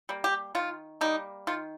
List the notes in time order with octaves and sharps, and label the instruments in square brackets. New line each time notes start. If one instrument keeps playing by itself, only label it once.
[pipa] G3 A#3
G4
D#3 F4
G3 A#3 D#4
D#3 F4